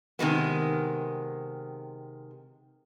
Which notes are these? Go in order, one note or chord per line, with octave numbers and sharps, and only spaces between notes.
C3 D#3 G#3 B3